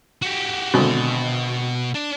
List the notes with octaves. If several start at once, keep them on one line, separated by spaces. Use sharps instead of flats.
F#4 G4
G#1 G#2 B2 D3 B5
D4